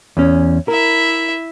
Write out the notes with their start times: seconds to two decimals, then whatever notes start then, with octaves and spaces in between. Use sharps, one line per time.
0.17 E2 C#4
0.68 E4 A#4 E5